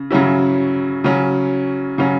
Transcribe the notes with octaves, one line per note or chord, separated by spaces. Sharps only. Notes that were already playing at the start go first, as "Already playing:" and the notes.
Already playing: C#3
C#3 F#3 C#4 E4
C#3 F#3 C#4
C#3 F#3 C#4